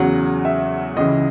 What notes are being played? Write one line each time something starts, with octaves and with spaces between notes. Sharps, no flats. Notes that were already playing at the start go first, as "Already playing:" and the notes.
Already playing: E2 C#3 F#3 F#5
E5
C#2 C#3 E3 D#5